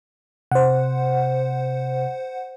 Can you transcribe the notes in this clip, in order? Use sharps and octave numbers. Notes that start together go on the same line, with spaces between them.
C3 C5 F#5